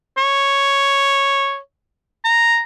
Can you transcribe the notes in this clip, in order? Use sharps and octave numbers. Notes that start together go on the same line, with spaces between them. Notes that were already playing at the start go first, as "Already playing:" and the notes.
C#5
A#5